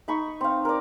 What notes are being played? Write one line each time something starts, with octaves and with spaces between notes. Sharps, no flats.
D#4 B5 C#6
C4 F5
A#4 D5